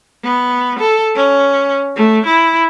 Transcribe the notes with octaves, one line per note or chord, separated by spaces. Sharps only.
B3
A4
C#4
A3
E4